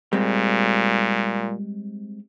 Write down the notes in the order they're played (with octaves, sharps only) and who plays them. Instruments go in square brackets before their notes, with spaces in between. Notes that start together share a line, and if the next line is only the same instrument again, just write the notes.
[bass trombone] A#2 [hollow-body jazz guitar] G3 G#3 C4